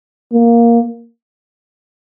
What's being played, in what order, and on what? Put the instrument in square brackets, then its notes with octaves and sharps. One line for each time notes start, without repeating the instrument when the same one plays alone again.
[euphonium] A#3